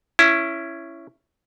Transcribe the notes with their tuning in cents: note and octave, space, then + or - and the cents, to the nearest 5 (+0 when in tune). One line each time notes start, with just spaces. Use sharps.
C#4 +0 E4 +15